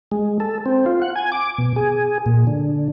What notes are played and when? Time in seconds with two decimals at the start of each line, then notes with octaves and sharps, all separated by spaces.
0.11 G#3
0.40 A4
0.66 C4
0.86 F4
1.02 F#5
1.16 G#5
1.32 D6
1.58 B2
1.76 G#4
2.26 A#2
2.47 D3